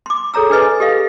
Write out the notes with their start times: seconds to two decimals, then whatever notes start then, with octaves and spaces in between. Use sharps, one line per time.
0.06 C6 D6
0.34 G#4 A4 C#5 A#5 E6
0.50 D4 G#4 B4 D#5 G#5
0.80 G4 A4 D#5 F5